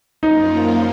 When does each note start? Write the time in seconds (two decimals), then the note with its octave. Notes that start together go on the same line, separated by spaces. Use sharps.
0.22 F#2 F3 A#3 D#4 F4